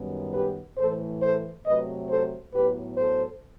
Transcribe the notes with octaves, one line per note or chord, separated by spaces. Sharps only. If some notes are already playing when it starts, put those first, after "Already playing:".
Already playing: F#2 D#3 G3 B3
G4 B4
A2 E3 A3 A4 C5
A4 C5
C3 F#3 A3 B4 D#5
A4 C5
A2 F#3 B3 G4 B4
A4 C5